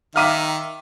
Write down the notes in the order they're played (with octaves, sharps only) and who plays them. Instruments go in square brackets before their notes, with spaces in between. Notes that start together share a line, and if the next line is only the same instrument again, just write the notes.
[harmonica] D#3 [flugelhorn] E5 [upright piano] F5 D6 B6 [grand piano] F6 D#7